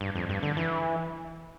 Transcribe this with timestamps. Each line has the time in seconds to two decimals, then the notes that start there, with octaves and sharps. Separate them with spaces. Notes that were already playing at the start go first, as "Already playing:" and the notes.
0.01 G2
0.15 F2
0.29 G2
0.43 D3
0.57 E3